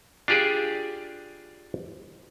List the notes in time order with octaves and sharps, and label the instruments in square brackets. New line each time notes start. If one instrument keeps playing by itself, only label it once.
[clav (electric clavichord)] D4 F4 G4 G#4 D5